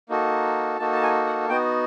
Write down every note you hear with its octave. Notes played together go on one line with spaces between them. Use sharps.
A#3 D#4 F#4 A4
A#3 D#4 F#4 A4 A5
A5
G#5
F#5
B3 D#4 F#4 G5